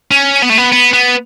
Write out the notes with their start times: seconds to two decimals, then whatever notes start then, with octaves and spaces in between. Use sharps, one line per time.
0.11 C#4
0.42 B3
0.50 A3
0.57 B3
0.72 B3
0.93 B3